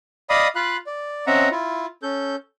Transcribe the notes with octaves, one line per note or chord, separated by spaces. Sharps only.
D5 D#5 F5 B5 D#6
F4 F5 B5 F#6
D5
C4 C#4 D#5 E5 F#5 A#5
E4 F4
C#4 A4 G6